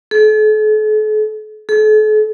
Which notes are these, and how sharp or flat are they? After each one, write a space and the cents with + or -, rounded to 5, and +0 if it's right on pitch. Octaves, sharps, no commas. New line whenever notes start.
A4 -45
A4 -45